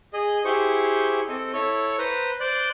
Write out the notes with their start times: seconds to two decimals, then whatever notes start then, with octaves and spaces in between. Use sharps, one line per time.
0.13 G#4 D#5
0.45 E4 G4 G#4 C5 C#6
1.28 C4 A4 D#5
1.53 E4 A4 C#5 C#6
1.98 B4 C5 A#5
2.40 C5 D5 F#6